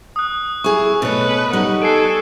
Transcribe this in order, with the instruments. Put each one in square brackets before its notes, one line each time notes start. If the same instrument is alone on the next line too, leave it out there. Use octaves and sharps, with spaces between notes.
[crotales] D#6 F#6
[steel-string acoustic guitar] E4 G#4 [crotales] C#6
[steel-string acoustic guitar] B2 C#5 [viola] A3 B4
[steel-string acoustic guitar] G3 D#4 D#5 [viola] F#5
[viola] A4 G#5 [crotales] C7 D7